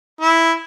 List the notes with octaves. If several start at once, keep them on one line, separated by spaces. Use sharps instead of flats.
E4